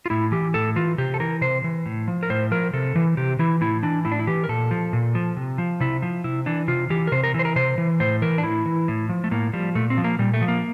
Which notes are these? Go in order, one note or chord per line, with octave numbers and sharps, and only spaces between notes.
F4
A2 E4
E3 G4
A2 A4
E3 F4
C3 G4
A4
E3 A#4
C3 C5
E3
A2
F3
A#4
A2 C5
F3 A#4
C3 A4
E3
C3 G4
E3 E4
A2 E4
E3 D4
A2 E4
D4
E4
E3 G4
A#4
A#2 A4
F3
A#2
F3
C3
F3
C3 E4
F3
C3 E4
E3 D4
C3 F4
E3 G4
A#4
C3 C5
A#4
E3
C5
A#4
C3 C5
E3
A2 C5
E3 A#4
D4
A2 E4
E3
A2
F3
A3
A2 A#3
F3 G3
A#2 A3
C4
F3
A#3
A#2 G3
A3
F3
A#3